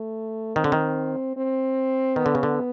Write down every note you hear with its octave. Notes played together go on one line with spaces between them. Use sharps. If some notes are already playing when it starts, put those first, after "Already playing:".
Already playing: A3
D#3 C4
D3
D#3
C4
D#3 B3
D3
C#3
D3